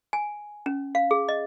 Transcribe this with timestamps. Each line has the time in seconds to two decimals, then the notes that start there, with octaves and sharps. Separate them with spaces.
0.13 G#5
0.66 C#4
0.95 F5
1.11 G#4
1.29 D#5